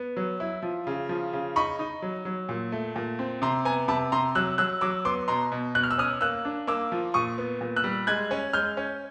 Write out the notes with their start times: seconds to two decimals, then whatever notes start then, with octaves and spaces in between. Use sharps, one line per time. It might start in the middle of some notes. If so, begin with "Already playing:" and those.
Already playing: B3
0.17 F#3
0.40 E4
0.62 F3
0.87 C#3
1.09 F3
1.33 C#3
1.56 D#4 B5 C#6
1.79 D#4
2.02 F#3
2.25 F#3
2.49 A#2
2.72 A3
2.96 A#2
3.19 C4
3.42 C3 A#5 C6
3.65 B3 G#5 A#5
3.88 C3 A5 B5
4.12 C3 A#5 C6
4.35 F#3 E6 F#6
4.58 F#3 E6 F#6
4.81 F#3 D6 E6
5.05 B3 C6 D6
5.28 B2 A#5 C6
5.52 B2
5.75 B2 F#6
5.83 F6
5.91 E6
5.98 C#4 D#6 F6
6.21 A#3 E6 F#6
6.45 D4
6.67 A#3 D6 E6
6.92 F3
7.14 A#2 C#6 D#6
7.38 B3
7.61 A#2
7.76 E6 F#6
7.84 G3
8.07 G#3 F#6 G#6
8.31 C#4
8.53 G#3 F6 G6
8.77 C#4